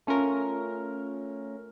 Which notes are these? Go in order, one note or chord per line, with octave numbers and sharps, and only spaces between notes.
A3 C#4 F4 A#4